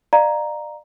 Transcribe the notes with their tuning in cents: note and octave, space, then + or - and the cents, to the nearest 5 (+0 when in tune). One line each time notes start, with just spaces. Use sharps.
D5 +35 F5 +0 A#5 +0